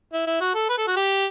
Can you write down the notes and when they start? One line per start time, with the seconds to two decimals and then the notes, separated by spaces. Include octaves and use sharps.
0.13 E4
0.27 E4
0.41 F#4
0.55 A4
0.69 B4
0.78 A4
0.88 F#4
0.96 G4